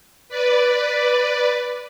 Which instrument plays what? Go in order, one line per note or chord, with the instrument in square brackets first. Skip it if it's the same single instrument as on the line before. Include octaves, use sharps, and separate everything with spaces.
[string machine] B4 D5